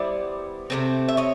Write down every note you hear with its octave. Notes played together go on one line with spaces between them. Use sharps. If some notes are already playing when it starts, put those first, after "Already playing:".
Already playing: G3 B3 E4 C5 D5
C3 F3 A3 C4
E5
C#5 D#5